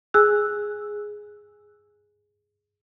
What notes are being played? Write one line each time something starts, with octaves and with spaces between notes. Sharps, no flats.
G#4 G#5 E6 F#6